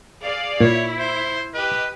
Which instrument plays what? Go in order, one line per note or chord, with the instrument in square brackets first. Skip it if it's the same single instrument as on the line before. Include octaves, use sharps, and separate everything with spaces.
[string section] G#4 D5 F5
[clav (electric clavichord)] A#2 [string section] E4 [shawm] C#5
[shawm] C5
[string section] G4 D#5 [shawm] B4